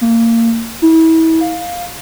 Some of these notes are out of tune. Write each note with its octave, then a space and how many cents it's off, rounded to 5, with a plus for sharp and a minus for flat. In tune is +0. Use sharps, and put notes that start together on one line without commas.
A#3 -25
E4 -30
F5 +10